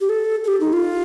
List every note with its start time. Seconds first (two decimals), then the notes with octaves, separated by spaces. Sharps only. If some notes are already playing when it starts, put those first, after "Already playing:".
0.01 G4
0.09 A4
0.44 A4
0.48 G4
0.61 D#4
0.73 F4